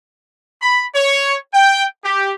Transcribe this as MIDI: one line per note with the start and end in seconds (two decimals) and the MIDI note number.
0.61 0.85 83
0.95 1.36 73
1.54 1.86 79
2.04 2.33 67